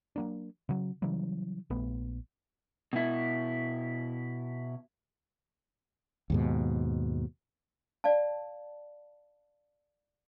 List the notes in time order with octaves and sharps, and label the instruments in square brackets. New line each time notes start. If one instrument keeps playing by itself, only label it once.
[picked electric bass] F#3 A#3 D4
C#3 F#3
C#3 E3 F#3 G3
A#1 A3 B3
[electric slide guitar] B2 E4
[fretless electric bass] D#2 G#2 B2
[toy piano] D5 F5 A5